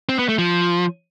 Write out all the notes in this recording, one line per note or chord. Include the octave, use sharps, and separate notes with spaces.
C4
B3
A3
F3